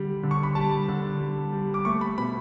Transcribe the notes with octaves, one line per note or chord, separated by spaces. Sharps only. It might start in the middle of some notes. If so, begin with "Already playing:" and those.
Already playing: D3 G3
D3
C#6
B5
G3 A5
D3
G3
G3
D6
A3 C#6
B5
B2 B5